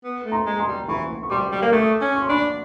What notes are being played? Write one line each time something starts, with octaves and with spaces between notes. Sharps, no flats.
B3
A3
A#5 C6
G#3
A#5 C6
G3
E3 B5 C#6
C#6
G3 C6 D6
G3
A#3
A3 C#6 D#6
C#4
C#6
C6
D4 B5 C#6